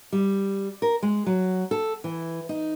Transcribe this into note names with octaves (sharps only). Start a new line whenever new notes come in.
G3
A#4
G#3
F#3
A4
E3
D#4